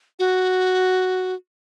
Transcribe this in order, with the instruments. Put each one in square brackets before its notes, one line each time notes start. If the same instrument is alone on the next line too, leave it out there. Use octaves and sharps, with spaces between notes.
[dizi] F#4